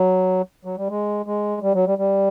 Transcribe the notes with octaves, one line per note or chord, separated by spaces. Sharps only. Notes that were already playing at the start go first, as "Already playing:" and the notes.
Already playing: F#3
F#3
G3
G#3
G#3
G3
F#3
G3
G3